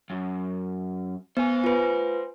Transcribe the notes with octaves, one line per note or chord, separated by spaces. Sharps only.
F#2
B3 C5 G#5
F4 B4